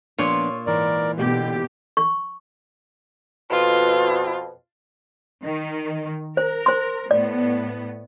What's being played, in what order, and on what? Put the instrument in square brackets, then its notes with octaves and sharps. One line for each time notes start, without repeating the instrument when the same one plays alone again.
[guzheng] A#2 F4 C#5 [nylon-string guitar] F3 B3 D4
[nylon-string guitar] G#2 E3 [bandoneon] A#4 D5
[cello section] B2 G4 [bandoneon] D3
[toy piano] C#6
[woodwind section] F2 B2 [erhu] F4
[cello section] D#3
[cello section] A#4 [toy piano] C5
[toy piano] C5 C6
[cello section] A2 B3 [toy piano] D5